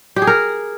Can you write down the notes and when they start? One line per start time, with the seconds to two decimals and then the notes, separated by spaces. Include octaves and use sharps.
0.16 G4
0.22 G#4
0.27 A#4